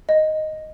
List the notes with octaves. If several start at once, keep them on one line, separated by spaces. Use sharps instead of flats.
D#5